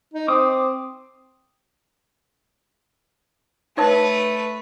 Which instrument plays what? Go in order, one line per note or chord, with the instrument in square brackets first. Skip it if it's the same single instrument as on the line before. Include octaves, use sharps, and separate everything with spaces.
[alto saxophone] D#4
[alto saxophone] C4 [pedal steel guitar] D6 D#6
[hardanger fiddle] A3 B4 [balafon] D#4 C#5 A5